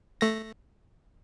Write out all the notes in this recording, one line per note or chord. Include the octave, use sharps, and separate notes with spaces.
A3 A#6